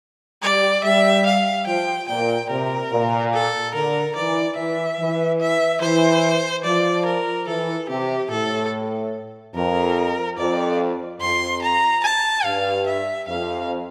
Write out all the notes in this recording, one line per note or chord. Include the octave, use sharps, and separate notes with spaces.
G3 D5
G3 E5
F5
F3 G5
A#2 G5
C3 A#4
A#2
A4
D3 A#4
E3 D5
E3 E5
E3
E5
E3 C5
F3 D5
A#4
E3 A4
C3 G4
A2 A4
F2 A#4
F2 D5
F2 C6
A#5
A5
G2 F5
E5
F2 F5